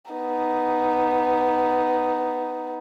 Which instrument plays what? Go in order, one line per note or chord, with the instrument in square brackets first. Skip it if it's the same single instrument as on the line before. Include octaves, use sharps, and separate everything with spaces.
[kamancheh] B3 D#4